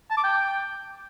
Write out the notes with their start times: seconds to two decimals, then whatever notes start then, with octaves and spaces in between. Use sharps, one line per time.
0.10 A5
0.17 D6
0.24 G5